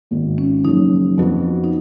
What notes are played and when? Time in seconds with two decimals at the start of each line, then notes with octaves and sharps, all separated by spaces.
0.11 G#1 G#2 D#3
0.38 C#4
0.64 F#1 F#2 C#3 F3 D#4
1.17 F2 F3 B3 F#4
1.64 D#4